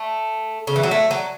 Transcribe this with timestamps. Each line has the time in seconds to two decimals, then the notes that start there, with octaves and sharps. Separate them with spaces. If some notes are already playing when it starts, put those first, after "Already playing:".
Already playing: A3
0.67 C#3
0.76 E3
0.83 F#3
0.91 A3
1.11 F#3